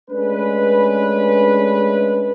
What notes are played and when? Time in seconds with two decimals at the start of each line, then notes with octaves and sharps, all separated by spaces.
0.11 G#3 A3 C#4 D4 B4